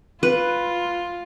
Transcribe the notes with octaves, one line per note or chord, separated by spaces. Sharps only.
F4 B4